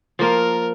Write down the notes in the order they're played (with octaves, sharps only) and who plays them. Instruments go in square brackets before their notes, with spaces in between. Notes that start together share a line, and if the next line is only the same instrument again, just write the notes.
[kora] F3 A#3 F4 [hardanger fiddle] A#4